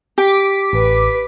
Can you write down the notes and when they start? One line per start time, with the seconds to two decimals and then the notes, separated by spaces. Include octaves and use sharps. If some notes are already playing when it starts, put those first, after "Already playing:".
0.18 G4 D6 B6
0.73 A1 B4